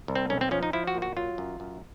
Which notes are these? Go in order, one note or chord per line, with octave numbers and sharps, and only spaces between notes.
C2
C4
B1 C#4
C4
F3 C#4
D#4
F3 E4
F#4
A#2
F#4
F#3 F4
F#2
F#2